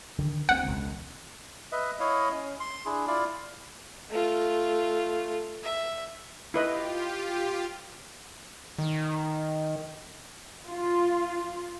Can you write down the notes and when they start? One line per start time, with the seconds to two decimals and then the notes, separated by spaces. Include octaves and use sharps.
0.18 D3 D#3
0.49 D2 A3 C4 F#5
0.63 E1 C#2
1.72 B4 D#5 E5
2.00 E4 C#5 D#5 F5
2.32 C#4
2.60 C6
2.86 D4 E4 G#4
3.07 E4 F4 D5 F5
4.10 A3 F4
5.63 E5
6.54 E4 F4 G4 B4 D#5
8.79 D#3
10.69 F4